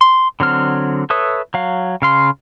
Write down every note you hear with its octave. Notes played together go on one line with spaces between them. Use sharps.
C6
D3 F#3 C4 F6
A4 B4 C#5 E5 D#6
F#3 F5
C#3 F5 C6